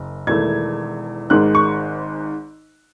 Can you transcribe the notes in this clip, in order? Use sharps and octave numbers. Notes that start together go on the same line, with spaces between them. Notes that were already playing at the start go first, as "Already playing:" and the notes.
Already playing: F#1 F#2
E1 E2 D#3 A3 G#6
G#1 G#2 D#3 G#3 F#6
C#6